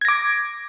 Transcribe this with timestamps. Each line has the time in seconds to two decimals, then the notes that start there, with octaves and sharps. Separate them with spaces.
0.01 G#6
0.05 A#6
0.08 D6